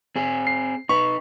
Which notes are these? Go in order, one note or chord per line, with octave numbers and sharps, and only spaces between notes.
C4 G#4
C7
D#4 B4 C#6